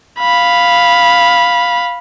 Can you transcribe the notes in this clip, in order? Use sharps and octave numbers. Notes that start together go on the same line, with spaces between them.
F5 B5